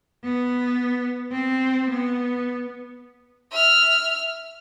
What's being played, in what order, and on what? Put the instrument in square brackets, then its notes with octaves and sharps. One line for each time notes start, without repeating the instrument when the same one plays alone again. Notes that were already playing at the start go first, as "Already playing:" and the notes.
[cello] B3
C4
B3
[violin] E5 F6